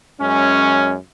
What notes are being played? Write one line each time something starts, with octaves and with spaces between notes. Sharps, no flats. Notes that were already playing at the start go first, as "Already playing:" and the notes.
F#2 G#3 C#4